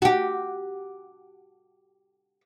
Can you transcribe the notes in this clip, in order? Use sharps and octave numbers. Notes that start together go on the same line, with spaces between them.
F#4 G4